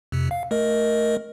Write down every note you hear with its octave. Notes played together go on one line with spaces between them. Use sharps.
F2 C3
F5
A3 A#4 D#5